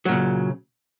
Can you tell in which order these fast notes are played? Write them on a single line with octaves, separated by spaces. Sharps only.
F#3 A#2 C#3